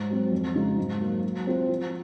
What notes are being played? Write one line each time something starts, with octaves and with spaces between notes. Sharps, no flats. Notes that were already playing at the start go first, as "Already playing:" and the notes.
Already playing: G#2
F#3 C4
F2
C#3 G#3 D#4 F#4
G#2
F#3 A#3
F#3
C4 F4 C5
F3